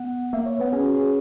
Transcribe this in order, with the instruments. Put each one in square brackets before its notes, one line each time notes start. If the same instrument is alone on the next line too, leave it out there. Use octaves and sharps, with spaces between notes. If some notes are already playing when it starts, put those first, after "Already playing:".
Already playing: [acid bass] B3 [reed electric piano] F#5
[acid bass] A#3 [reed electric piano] E5
[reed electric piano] C#5
[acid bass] B3 [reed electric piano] B4
[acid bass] C#4 [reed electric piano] G#4
[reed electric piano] F#4
G#4